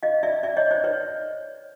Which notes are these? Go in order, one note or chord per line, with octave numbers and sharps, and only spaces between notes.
D#5 F5
D5 E5
D5 E5
C#5 D#5
C5 D5
B4 C#5